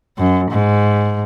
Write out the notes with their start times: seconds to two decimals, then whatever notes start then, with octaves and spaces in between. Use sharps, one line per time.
0.18 F#2
0.51 G#2